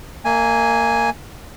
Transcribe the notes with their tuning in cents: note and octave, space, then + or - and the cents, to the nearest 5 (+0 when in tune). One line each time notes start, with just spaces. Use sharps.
A#3 -20 D#5 +30 G#5 +0